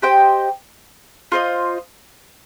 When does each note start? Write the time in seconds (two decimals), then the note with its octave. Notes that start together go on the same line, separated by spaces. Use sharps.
0.02 G4 C5 D#5 G5
1.32 F4 C5 D#5